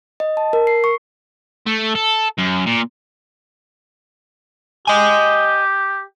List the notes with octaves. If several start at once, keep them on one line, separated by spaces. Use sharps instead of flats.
D#5
A5
A#4
C7
C#6
A3
A4
F#2
A#2
G4 D#5 G#5